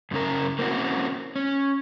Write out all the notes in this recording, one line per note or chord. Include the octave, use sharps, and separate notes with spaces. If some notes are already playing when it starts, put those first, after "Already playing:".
F#2 C#3 C#4 A#4
A#3 C4 C#4 E4 F#4
C#4